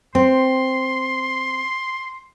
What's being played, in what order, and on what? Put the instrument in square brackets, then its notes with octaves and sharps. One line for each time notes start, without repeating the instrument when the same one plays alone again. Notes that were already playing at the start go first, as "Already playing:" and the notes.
[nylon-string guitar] C4 [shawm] C6